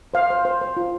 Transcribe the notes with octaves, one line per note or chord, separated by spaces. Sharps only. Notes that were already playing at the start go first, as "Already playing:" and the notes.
C5 F5
C5
C5
C5
F4